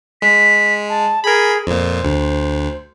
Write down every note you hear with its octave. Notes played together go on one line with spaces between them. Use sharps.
G#3 B6
A5
G#4 A#4 B5
F2 A#2 C5
D2